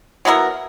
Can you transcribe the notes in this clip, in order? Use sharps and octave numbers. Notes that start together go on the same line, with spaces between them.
F#3 B3 E4 A#4